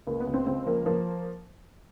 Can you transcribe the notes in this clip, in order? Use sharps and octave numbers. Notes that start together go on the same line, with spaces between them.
C#2 A#3
B3
C#2
C4
C#2 C4
F3 A#3
F3 A#3